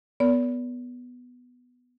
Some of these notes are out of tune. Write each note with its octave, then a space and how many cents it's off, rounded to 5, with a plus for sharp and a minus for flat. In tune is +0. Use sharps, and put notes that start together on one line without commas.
B3 +5 A#4 +0 D5 -40